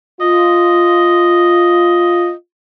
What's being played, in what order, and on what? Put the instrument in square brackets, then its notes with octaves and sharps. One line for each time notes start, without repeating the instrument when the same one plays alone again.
[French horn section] F4 [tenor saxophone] D#5